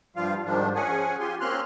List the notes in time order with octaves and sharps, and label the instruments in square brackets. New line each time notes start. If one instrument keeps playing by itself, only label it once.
[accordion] G2 F3 G3 F4 F5
G#2 D#3 F3 G3 D4
F3 C#4 G#4 F#5 G#5
F4 G4 G#5 C6
A#3 C4 C#4 C6 F6 F#6